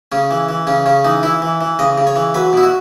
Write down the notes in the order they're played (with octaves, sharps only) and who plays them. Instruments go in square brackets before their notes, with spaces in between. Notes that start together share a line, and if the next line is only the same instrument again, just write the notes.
[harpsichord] C#3 C#4
E3
E3
C#3 C#4
C#3 C#4
E3 D#4
E3 E4
E3
E3
C#3 D#5
C#3
C#5
E3
F#3 B4
B2 E4
F#4